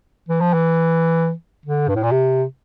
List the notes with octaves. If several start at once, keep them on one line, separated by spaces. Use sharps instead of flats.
E3
F3
E3
D3
G2
A2
A#2
C3